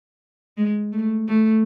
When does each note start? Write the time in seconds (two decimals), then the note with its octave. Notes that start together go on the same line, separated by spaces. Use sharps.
0.57 G#3
0.92 A3
1.28 A3